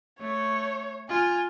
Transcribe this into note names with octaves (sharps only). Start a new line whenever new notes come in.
A3 C#5
F4 G#5